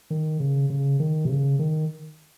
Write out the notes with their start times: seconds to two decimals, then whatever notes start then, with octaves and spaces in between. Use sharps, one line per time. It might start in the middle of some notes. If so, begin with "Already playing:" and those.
0.10 D#3
0.40 C#3
0.70 C#3
1.00 D#3
1.25 C3
1.29 C#3
1.59 D#3